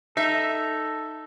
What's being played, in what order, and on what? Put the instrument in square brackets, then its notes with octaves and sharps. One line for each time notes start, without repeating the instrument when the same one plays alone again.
[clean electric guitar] D#4 [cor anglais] A4 [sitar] E5